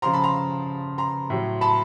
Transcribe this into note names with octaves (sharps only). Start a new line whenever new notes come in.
C#3 F3 A#5 C6
A5 B5
A#5 C6
A#5 C6
A2 F#3
A5 B5